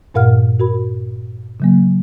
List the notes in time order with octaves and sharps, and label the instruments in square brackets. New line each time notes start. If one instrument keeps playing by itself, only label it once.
[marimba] G2 A#2 A#4 F5 F#5 F6
F#4 A#4 B5
C#3 F#3 A#3